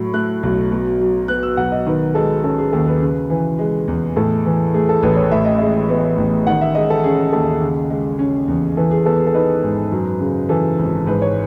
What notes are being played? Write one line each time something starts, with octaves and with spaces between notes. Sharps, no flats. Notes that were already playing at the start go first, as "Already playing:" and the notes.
Already playing: A2 F#3
A3 F#6
B1
B2
F#3
B3 F#6
E6
B1 F#5
D#5
D#3 B4
G#3 A4
C#4 A4
G#4
D#2 A4
B4
C#3
E3
G#3
E2
A2 A4
E3
A3 G#4
A4
A1 B4
C#5
A2 E5
D#5
G#3 E5
B3
A1
D#3 F#5
E5
G#3 D#5
A4
C#4 G#4
D#2 A4
C#3
G#3
C#4
E2
E3 A4
G#4
B3 A4
G#4
A4
D#4 B4
G#2
F#2
C#3
E3 A4
G#1
G#2 B4
C#5